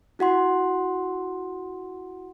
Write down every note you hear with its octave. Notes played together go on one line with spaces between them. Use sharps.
E4 F#4 F#5 C6